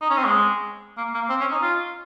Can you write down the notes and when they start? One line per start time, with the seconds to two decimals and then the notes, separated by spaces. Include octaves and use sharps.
0.02 D#4
0.10 C#4
0.17 C4
0.25 G#3
0.97 A#3
1.14 A#3
1.29 C4
1.41 C#4
1.52 D#4
1.62 F4